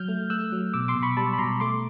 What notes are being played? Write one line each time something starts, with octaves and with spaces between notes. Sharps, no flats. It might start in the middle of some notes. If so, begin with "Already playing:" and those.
Already playing: F#3 F6 G6
A3
A3 E6 F#6
F#3
B2 D6 E6
C6 D6
B2
B5 C#6
G3 A5 B5
B5
B2 A#5 C6
A3 C6 D6